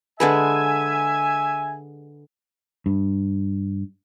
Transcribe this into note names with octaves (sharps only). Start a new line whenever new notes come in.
D3 G#3 B4 E5 G#5
G2